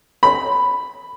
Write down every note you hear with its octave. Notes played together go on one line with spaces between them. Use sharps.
B5